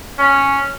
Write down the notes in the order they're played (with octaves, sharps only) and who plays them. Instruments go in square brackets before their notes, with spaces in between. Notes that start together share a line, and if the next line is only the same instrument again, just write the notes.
[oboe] C#4